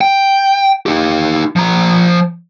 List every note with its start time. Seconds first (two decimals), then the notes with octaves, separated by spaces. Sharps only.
0.01 G5
0.86 D#4 G4
1.56 F3 A#5